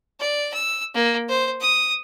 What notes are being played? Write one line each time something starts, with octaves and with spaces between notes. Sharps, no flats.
D5
E6
A#3
C5
D#6